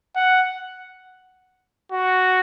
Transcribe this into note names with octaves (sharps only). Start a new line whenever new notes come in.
F#5
F#4